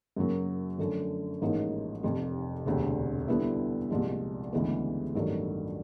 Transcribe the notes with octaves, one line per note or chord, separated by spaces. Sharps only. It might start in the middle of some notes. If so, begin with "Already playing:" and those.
F#2 C#3 F#3 A#3
F#2 D3 F3 A3 C#4
A1 G#2 F3 A#3 D#4
F1 F2 C3
E1 D2 C3
D3 G3 B3 E4
C2 A#2 F3 G#3
D2 C#3 E3 G#3 B3
A1 G2 D#3 F#3 A3